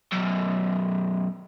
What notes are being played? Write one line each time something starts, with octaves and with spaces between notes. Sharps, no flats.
B1 F#2